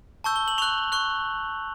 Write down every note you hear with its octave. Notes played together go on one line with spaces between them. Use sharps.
A5 C#6 E6 G6
G7
F#7
C#6 F#6 F7
C#6 F#6